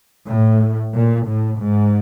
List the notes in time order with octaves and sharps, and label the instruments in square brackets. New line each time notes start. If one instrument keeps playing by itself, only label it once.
[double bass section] A2
A#2
A2
G#2